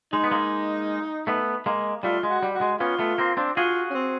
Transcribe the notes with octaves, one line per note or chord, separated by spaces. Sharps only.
G#3 D#4
B3
G#3 A#3
A3 B3
G#3 A#3
G3 A3 F4
G#3
F#4
G3
F#4
G#3
B3 C#4 F4
A3 B3
A#3 C4
C4 D4
F4 F#4 G#4
C#4
C4